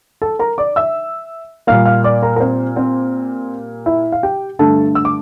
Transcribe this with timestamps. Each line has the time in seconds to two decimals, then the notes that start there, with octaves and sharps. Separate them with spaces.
0.22 A4 A5
0.39 A#4 A#5
0.58 D5 D6
0.76 E5 E6
1.67 A#2 G3 A#3 F5 F6
1.85 F5 F6
2.04 D5 D6
2.22 A#4 A#5
2.36 A#4
2.40 C4 C5
2.76 C4 C5
3.86 E4 E5
4.12 F5
4.23 G4 G5
4.59 G2 D3 A3 A4 A5
4.95 E6
5.05 D6